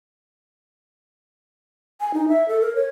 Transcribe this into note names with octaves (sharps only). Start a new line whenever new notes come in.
G#5
D#4
E5
A4
A#4
C#5